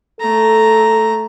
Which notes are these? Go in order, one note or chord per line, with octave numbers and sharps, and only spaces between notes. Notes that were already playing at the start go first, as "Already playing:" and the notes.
A3 A4 A#5